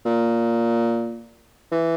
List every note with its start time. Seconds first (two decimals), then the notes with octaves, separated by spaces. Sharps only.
0.06 A#2
1.71 E3